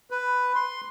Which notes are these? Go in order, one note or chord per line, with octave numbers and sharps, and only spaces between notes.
B4
C6